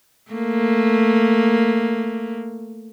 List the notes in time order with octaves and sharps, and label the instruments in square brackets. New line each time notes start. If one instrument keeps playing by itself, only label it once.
[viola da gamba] A3 A#3